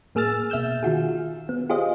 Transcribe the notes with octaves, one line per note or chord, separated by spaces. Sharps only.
A2 A#3 G#4 E6 F6 A6
B2 E5 F6 G6 E7
D#3 F4 F#4 G#4
B3
F4 G4 G#4 C5 D#5 F5